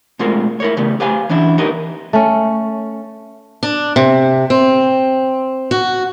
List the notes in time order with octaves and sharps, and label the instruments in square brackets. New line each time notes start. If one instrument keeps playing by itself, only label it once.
[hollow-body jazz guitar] B2 G#3 A3 C4 F4 A#4
E4 A#4 C#5
C#3 G3 A3 B3
G4 B4 C5 F5 G#5
E3 C#4 D4 E4
D#4 G4 A#4 B4 D#5
[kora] A3 C#4
[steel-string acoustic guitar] D4
C3
C4
F#4